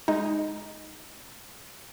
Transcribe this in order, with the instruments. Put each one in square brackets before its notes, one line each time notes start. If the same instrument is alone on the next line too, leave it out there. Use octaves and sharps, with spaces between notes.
[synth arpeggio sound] G#3 D#4